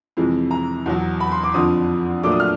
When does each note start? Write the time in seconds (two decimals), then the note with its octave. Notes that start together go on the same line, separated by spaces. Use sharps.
0.17 F2 C3 E3 G#3
0.51 A#5
0.86 E2 B2 F#3
1.20 B5
1.32 C6
1.44 D6
1.54 F2 D3 F3 D#6
2.23 A#2 F#3 A3 D4 D6
2.32 D#6
2.40 F6